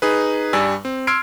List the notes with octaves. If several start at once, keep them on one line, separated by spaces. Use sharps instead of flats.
D#4 G#4 B4
G2 G3 D5 G#5 E6
C4
C6 E6 F6 G#6 C7 D7